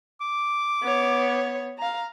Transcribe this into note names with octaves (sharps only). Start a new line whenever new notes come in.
D6
B3 C#5
F5 A#5